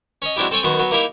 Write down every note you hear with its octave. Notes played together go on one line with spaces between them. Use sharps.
C#4 C#5 D#5
F#3 G#3 C4 D4 E4 G4
C4 A4 C#5 G5 G#5
F#2 D#3 B3 F#4 F#5 C6
F#3 B3
A#3 D#4 E4 G4 A#4